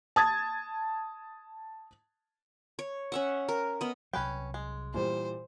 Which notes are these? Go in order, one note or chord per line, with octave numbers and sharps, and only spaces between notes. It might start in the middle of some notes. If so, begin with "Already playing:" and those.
A5 D#6 G#6 A6
C#5
C#4 E5 F#5
A#4
B3 D#5
C2 F#3 C#4 B4 G5
G#3
A#2 E3 G3 C5